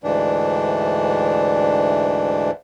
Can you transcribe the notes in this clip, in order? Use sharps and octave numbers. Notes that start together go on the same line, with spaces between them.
D2 G#2 E3 D4